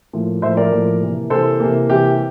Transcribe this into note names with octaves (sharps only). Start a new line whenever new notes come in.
A2 F3 A#3
A2 F3 A#3 C5 E5
A#4 D5
A2 F3 A#3
C3 E3 A#3
C3 E3 A#3 A4 C5
C3 E3 A#3
C3 E3 A#3 G4